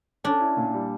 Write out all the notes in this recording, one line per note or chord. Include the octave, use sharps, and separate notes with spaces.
C#4 D4
E4
A#2
G3